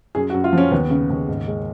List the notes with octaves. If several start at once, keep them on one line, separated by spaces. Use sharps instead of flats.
F#2 G#4
F#4
F#2
F4
F3 C#4
D#2 B3
C#3
D#2
G#2
G#3